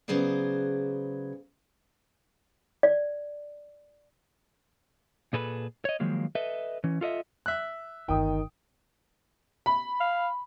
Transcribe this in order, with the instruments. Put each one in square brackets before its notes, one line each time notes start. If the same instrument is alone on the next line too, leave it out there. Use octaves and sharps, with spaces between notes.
[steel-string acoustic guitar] C#3 F#3 B3 G#4 C5 D5
[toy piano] D5
[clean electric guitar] A#2 G#4 A4 B4 A#5 B5
C#5 D#5
D#3 F3 F#3 G#3 A#3
A4 B4 D#5 E5
E3 C#4
F4 A4 D#5 E5
[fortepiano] E5 F#6
[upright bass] G1 E2 [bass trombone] D#3 [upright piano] G5 D#6
[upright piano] B5
[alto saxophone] F5